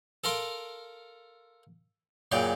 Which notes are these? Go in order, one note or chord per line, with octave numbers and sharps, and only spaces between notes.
A4 A#4 F5 C6 D6
F#2 A#2 C#3 D5 G5